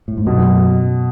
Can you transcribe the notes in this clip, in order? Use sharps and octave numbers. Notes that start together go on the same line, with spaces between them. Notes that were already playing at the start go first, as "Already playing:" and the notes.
A2
G#2
F#2 B2